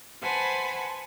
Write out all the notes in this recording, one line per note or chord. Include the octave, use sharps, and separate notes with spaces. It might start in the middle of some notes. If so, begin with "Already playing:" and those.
B4 C5 F#5 G#5 A5 B5